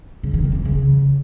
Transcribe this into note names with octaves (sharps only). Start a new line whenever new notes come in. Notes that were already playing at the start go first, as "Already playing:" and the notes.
C#3
D#3
C4
E3
C#3